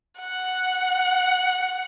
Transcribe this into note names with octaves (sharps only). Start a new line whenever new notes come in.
F#5